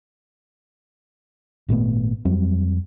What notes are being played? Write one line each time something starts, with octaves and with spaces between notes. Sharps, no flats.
G#1 A#2 A3 B3
F2 F#3 G3 C4